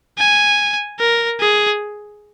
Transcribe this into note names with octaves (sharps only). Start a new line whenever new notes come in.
G#5
A#4
G#4